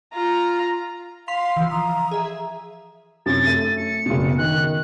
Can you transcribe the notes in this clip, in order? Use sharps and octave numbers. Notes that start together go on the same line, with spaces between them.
F4 A#5
F5 C6 B6 F7
E3 F3
A#5 D#6
G#4 E5
F#2 C3 A6
A3 D#7
C#7
F#1 B2
D#3 A#4 F#6